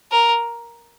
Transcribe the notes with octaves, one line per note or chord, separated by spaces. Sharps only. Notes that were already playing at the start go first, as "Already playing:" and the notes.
A#4